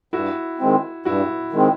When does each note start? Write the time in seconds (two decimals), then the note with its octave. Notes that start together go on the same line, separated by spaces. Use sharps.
0.13 G2 E4 F#4
0.60 D#3 G#3 C4
1.05 G2 E4 F#4
1.52 D#3 G#3 C4